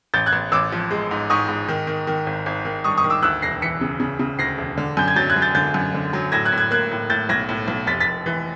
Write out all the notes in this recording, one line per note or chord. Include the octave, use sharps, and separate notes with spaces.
A1 G6 A6
F#6 G#6
A1
A1 D6 E6
F3
G#3
G#2
G#2 C#6 D#6
G#2
D#3
D#3
D#3
G#1
G#1
D#3
G2 C#6 D#6
C#6 D#6
D#3
D6 E6
D2 E6 F#6
E1 A#6 C7
E3 B6 C#7
C#3
C#3
C#3
D2 A#6 C7
E1
D3
F#2 G6
G#6
F#3 G6 A6
F#6 G#6
F#3
G6 A6
D3 G6 A6
F#2
D3
F#3
A2 G#6 A#6
F#6 G#6
A2
F#6 G#6
A#3 F#6 G#6
A2
A2 G6 A6
B1 G#6 A#6
A2
B1
F1 A6 B6
A6 B6
F1
E3